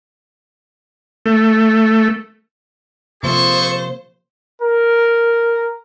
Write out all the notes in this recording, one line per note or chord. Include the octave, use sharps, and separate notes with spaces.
A3
C3 F3 A#3 G#4 A4 C5 C#6
A#4